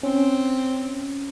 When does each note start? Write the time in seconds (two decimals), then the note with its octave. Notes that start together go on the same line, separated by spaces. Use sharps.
0.03 C4 C#4